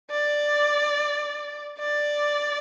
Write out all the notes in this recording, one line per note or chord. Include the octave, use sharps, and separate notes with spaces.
D5
D5